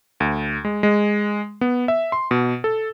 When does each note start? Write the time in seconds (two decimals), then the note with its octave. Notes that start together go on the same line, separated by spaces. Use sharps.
0.20 D2
0.65 G#3
0.83 G#3
1.61 B3
1.88 E5
2.12 C6
2.31 B2
2.64 A4